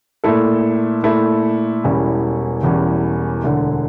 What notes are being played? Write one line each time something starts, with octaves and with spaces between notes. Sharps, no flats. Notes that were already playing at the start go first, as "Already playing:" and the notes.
A#2 A3 E4 A4
A#2 A3 E4 A4
E1 E2 E3 G3 C#4
E1 E2 E3 G3 C#4
E1 D2 D3